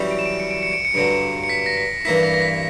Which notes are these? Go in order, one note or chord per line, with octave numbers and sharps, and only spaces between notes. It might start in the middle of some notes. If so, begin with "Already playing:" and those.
Already playing: F#2 E3 G3 C#4 E4
D7
E7
D7
C#7
D7
C#7
D7
C#7
G2 D3 F#3 D7
C#7
C#7
B6
A#6
B6
G2 E3 A#3 E4 B6
A#6
A#6
B6